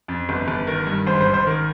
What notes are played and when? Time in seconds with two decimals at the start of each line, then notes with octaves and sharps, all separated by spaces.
0.08 F2
0.29 G1
0.48 G1
0.67 D#3 A#4
0.87 G2
1.06 G#1 C5
1.21 C5
1.26 G#1
1.34 C5
1.47 D#3 A#4